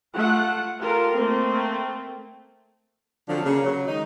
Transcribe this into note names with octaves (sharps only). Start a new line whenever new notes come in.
A3 F4 F#5
F4 G4 A4 A#4
A3 A#3 C4
D3 F3 F#3 C4 D4
C#3 A#3
C#3 F#3
D#3 G#3 D#4